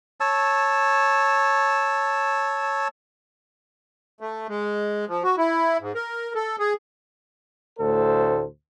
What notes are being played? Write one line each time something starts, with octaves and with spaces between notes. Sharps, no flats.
C#5 A5 E6
A3
G#3
F3
F#4
E4
G#2
A#4
A4
G#4
D2 A2 A4 C5